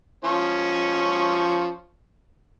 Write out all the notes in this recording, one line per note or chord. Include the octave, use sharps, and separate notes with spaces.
F3 C#4 C#5